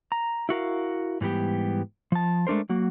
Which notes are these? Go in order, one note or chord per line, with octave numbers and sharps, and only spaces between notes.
A#5
E4 F#4 A#4 F5
G#2 E3 G3 B3 G4
F3 A5
G#3 A3 D4 A#4 C5
F#3 A#3 F#4